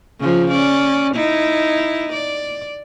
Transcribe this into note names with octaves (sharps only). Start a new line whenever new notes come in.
C#3 F3 F4
C#4 D5
D#4 E4
D5